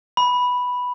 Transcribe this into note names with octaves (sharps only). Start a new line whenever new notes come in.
B5